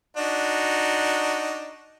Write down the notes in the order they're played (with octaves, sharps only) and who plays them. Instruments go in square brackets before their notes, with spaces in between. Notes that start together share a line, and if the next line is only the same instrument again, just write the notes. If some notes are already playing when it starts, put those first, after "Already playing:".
[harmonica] D4 D#4 F#4